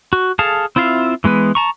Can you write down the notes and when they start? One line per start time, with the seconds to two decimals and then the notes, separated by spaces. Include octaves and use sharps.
0.13 F#4
0.39 G#4 A4 F5 A5
0.76 C4 E4 F4 E5 F5
1.24 E3 G#3 B3 B4
1.55 A5 A#5 C#6